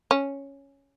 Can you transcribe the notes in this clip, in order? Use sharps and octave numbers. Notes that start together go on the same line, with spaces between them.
C#4